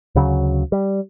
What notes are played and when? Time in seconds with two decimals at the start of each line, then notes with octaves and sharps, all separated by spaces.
0.15 D2 C#3 F#3
0.72 G3